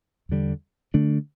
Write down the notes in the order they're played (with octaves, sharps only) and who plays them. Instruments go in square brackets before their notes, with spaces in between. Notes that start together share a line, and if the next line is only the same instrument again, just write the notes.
[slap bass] E2 D3 G3
D3 A3 D4